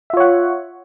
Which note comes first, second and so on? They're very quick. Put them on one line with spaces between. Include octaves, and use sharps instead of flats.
E5 F4 C#5 F#5